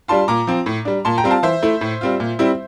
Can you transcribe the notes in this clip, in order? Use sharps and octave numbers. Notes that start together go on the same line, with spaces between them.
G3 D4 F4 A5 C6
A#2 A#5 D6
F3 C4
A2
G3 D4
A#2 A5 C6
G5 A#5
G3 C4 F4
F5 A5
E3 C5 E5
A3 E4
A2
G3 C4 F4
A#2
G3 C4 E4